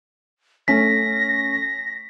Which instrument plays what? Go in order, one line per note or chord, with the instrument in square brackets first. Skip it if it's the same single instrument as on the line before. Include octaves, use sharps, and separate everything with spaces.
[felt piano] A3 C#4 [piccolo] A#6 [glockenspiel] B6